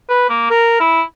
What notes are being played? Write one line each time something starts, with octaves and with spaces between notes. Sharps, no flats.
B4
A#3
A#4
E4